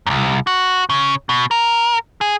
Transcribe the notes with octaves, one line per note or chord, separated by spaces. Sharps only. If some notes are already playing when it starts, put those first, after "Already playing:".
C2 F#2
F#4
C#3
B2
A#4
G#4